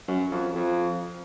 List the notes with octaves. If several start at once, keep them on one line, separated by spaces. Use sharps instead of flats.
F#2
F2
F2